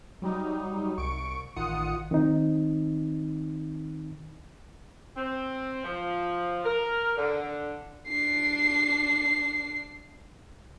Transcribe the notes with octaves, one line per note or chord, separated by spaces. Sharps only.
F#3 G3 D#4
C2 C#6 D7
A1 D#3 F4 F#5 D#6 C#7
D#3 C4 D#4
C4
F3
A#4
D3
D4 C7